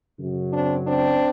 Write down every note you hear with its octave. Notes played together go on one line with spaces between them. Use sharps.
F#2 C#3 F#3
C4 D4
C4 D4